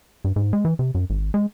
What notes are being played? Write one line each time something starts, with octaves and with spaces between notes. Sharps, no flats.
G2
G#2
G#3
E3
C3
F#2
G#1
G#3